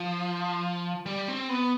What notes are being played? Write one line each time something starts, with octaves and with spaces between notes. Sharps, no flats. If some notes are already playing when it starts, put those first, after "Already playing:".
Already playing: F3
G3
C4
B3